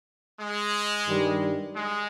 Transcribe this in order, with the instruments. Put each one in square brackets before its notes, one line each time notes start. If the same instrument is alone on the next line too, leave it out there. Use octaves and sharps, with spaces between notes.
[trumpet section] G#3
[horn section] G2 D#3 G3
[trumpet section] G#3